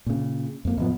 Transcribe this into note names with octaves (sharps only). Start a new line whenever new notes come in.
A#2 C#3
F2 A#3
F1 A2 F3 B3